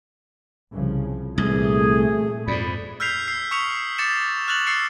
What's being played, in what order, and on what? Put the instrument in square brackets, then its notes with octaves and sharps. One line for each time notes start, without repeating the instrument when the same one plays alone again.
[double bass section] C2 C#3 F3
[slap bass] C2 [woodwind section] F#2 E3 G#4 [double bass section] A#2 A3
[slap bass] F2 G#2 [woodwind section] D5 B5
[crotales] E6 F6 G6 B6 C7 F7
E6 C7
C#6 D#6 F6 B6 C#7 F7
D6 A6 C7 C#7 E7
F6 F#6 A6 F7 F#7
E6 F6 A6 C7 C#7